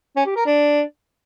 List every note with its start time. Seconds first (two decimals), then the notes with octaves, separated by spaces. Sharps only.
0.16 C#4
0.26 G4
0.36 A#4
0.46 D4